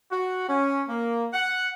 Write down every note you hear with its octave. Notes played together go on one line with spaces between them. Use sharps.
F#4
C#4
A#3
F#5